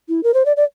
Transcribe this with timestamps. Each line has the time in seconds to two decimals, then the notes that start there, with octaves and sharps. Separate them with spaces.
0.09 E4
0.23 A#4
0.34 C5
0.46 D5
0.57 D5